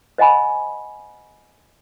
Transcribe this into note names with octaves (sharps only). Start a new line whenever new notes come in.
C5 D#5 F#5 G#5 B5